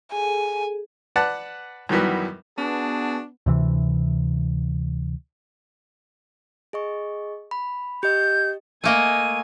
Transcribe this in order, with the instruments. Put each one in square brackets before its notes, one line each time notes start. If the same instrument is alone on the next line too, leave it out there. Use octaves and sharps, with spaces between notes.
[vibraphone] G#4 A4 [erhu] G#5
[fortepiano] B4 D5 F#5 A5
F#2 D#3 E3 F#3 G3 B3
[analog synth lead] B3 [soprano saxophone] D4 [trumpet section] F#4 G#4 A5
[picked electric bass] D2 C3 E3
[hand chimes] G#4 D#5 C#6
B5
[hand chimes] G4 D#5 [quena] G6
[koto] A3 A#3 D#5 [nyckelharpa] G#5 [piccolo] D#7